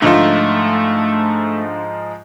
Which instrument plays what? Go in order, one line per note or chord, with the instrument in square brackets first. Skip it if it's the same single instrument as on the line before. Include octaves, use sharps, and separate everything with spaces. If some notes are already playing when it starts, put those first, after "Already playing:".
[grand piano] G#2 F3 D#4 [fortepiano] D3 F4 [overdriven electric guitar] A3